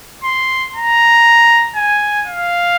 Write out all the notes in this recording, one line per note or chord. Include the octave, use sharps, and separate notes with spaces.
C6
A#5
G#5
F5